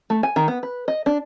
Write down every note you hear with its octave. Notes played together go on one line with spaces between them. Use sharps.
A3
G#5
D#3
B3
B4
D#5
D4